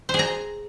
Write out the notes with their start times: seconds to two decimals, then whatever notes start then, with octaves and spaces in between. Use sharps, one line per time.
0.09 C5
0.14 G#4
0.19 A#5